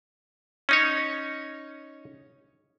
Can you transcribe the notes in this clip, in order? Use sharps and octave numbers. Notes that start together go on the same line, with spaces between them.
C#4 D#4 C#5